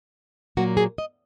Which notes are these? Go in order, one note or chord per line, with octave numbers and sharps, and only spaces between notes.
A#2 F#3 A#3 F#4
G#4
D#5